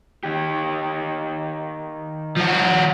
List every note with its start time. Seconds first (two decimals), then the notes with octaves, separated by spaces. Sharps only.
0.23 D#3 G4
2.37 F3 F#4